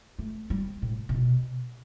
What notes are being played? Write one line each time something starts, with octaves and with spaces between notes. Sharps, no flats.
A3
G3
A2
C3
B2